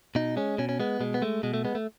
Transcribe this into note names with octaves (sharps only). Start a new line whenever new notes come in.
B2 D#4
G#3 C#4
B2 C#4
C#4
G#3 B3
B2 G#3
B3
G#3 A3
B2 G#3
A3
G#3 B3
A3